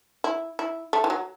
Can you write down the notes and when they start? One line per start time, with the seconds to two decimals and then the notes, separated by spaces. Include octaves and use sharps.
0.24 E4
0.59 E4
0.93 A3
1.04 E3
1.10 F#3